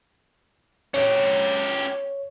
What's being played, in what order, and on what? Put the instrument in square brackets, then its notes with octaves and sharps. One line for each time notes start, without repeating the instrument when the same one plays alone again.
[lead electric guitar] C#4 G4 [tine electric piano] C#5